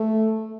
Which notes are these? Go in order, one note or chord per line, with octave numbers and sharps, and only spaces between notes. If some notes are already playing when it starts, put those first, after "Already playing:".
Already playing: A3